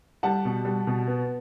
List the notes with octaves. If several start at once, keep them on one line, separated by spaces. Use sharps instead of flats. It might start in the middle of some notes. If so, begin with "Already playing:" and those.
G3 F#5 A5
B2
G3
B2
B3